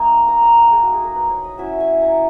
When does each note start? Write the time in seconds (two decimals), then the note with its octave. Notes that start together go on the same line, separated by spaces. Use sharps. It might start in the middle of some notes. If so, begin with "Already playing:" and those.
Already playing: A#3 D#4 G#5
0.28 A#5
0.42 A#5
0.57 F#5
0.72 G#4
0.82 F#4
0.94 G#4
1.04 A#4
1.15 B4
1.30 C#5
1.44 D#5
1.58 F#3 C#4 E4 E5
1.80 G#5
2.01 A#5